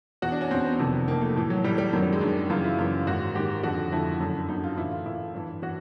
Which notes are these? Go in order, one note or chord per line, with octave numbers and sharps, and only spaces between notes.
E2 B2 F#4
D4
C#4
E2 B2 C4
B3
F2 C3 D#3
F2 C3 D#3 A#3
A3
A2 E3
F#3
A2 E3 G3
G3
F#2 D#3 F#3
G3
G#3
F#2 D#3 D4
F#2 C#3 E3 F4
E4
F#2 C#3 E3 F4
G#2 D#3 F#4
G#2 D#3 G4
F2 D3 F#4
F2 D3 E4
F#2 D3
F#2 D3 D#4
F4
A2 E3 E4
F4
A2 E3 E4
G2 E3
E3 F#4